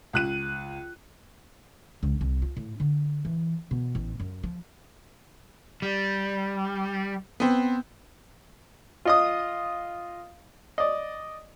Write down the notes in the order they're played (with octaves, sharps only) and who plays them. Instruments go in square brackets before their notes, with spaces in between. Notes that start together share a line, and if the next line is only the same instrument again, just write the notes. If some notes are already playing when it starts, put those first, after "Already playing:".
[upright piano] C#2 F#6 D#7
[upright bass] C#2
C2
F4
A2
D3
E3
B2
A1
F#2
F3
[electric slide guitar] G3
[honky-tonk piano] B3 C4
[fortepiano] F4 D#5 D#6
D5 D#5